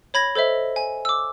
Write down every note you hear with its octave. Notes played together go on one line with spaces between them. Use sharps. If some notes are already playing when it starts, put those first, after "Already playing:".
C#5 B5 G#6 A#6
A4 C5 D#5 E5
G#5
D6 E6